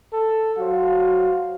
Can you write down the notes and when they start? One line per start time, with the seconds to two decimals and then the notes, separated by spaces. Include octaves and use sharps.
0.13 A4
0.58 F#3 F#4 C5 F5